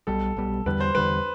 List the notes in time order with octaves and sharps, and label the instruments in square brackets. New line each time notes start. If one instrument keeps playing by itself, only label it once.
[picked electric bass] B1 B2 G3 [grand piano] A4
[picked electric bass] B1 B2 G3
[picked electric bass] E2 D3 G3 [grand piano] B4
[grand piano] C5
[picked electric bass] E2 D3 G3 [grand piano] B4